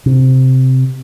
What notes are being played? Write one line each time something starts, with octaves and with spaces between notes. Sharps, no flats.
C3